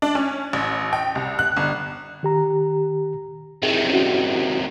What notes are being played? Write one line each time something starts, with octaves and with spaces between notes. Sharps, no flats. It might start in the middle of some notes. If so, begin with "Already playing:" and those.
D4
C#4
A1
G5
C2
F#6
G1
D#3 G4 A#5
C3 D#3 E4 G#4
C#4 E4 F#4